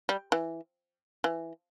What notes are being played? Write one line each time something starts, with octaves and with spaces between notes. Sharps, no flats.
G3
E3
E3